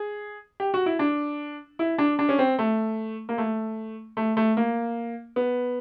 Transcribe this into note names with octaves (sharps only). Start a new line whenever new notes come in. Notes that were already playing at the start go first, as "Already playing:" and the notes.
Already playing: G#4
G4
F#4
E4
D4
E4
D4
D4
C#4
C4
A3
A#3
A3
A3
A3
A#3
B3